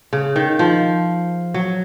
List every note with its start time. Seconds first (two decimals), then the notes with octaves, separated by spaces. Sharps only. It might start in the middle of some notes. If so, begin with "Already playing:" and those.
0.13 C#3
0.36 D#3
0.59 F3
1.54 F#3